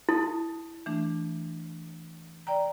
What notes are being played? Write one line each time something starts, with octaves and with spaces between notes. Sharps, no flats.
E4 A5 D#6
E3 A3 D4
D5 G5 A#5